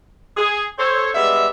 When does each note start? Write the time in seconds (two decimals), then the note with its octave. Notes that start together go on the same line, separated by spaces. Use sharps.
0.37 G#4
0.78 A4 C5 C#5
1.14 G3 G#3 B3 D4 E5